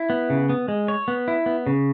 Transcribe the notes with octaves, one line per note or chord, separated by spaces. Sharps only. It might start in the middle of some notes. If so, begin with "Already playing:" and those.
Already playing: E4
B3
C#3
B3
G#3
C#5
B3
E4
B3
C#3